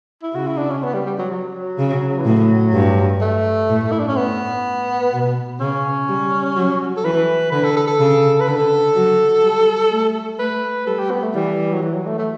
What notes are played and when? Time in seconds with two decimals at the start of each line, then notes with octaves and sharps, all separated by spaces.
0.23 E4
0.35 C#3 F#4
0.47 E4
0.58 D4
0.71 C#4
0.83 B3
0.94 G3
1.06 G3
1.19 F#3
1.31 F#3
1.78 C#3
2.19 E3
2.25 A2 F#3
2.73 G2
3.21 A3
3.69 A2
3.92 E4
4.00 D4
4.08 C#4
4.17 A2 B3
5.13 B2
5.60 C#3 C#4
6.09 G3
6.56 F#3
6.97 A4
7.04 E3 B4
7.52 D3 B4
7.64 A4
7.77 A4
7.87 A4
8.00 C#3
8.40 B4
8.48 D3 A4
8.95 F#3
9.43 G3
9.91 A3
10.39 A3 B4
10.86 G3 A4
10.99 G4
11.11 B3
11.23 A3
11.35 E3 G3
11.72 F#3
11.82 E3
11.94 F#3
12.07 A3
12.18 A3